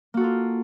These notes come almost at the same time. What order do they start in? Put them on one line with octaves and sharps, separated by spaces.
A#3 F#4 A4 F4